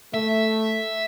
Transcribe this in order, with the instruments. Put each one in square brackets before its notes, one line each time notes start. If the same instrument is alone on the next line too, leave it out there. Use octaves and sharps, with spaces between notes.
[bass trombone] A3 [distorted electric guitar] E5